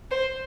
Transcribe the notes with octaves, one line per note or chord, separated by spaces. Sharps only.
C5